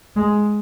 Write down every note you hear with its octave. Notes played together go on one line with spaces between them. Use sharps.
G#3